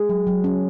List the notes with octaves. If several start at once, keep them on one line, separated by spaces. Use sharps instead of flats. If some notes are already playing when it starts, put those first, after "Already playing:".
Already playing: G#3
F#3
F#3
C#4